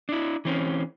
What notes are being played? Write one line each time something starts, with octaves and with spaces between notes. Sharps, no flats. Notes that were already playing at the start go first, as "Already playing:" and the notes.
D4 E4
E3 C4 C#4